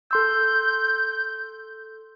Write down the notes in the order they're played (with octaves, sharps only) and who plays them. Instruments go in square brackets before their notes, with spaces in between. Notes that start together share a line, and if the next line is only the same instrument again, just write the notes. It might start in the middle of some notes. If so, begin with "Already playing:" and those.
[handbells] A4 C6 E6 [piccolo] G6